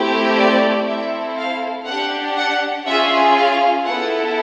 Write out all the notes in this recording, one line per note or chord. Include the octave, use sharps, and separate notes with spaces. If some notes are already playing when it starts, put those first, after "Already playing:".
Already playing: A3 C4 E4 G4
D5
C4 E4 A4 E5
F5
D4 G4 F#5
F#5
C#4 F4 G#4 E5
F5
B3 E4 A4 F#5